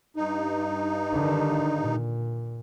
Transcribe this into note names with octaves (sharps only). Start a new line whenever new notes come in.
G2 D#4
D3 D#3
A#2